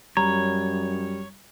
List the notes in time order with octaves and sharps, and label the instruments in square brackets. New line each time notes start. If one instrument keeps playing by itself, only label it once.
[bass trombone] F#2 [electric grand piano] G3 [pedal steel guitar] C#5 [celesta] A#5